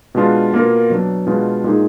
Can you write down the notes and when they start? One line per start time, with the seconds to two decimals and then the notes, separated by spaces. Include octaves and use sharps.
0.15 B2 G#3 D4 F4
0.53 B2 A#3 F4 A#4
0.90 B2 F#3 D4
1.27 B2 G#3 D4 F4
1.64 A#2 G#3 D#4 G#4